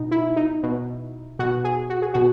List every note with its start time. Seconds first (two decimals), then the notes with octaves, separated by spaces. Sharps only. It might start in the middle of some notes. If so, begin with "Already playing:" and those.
Already playing: B2 D#4
0.11 E4
0.36 D#4
0.63 B2
1.39 B2 F#4
1.64 G#4
1.90 F#4
2.02 G#4
2.14 B2 F#4